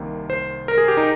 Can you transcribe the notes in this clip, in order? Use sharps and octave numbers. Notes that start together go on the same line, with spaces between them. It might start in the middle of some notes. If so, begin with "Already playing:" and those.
Already playing: C2 C3 D#3 A#3
C5
A#4
G#4
G4
D#4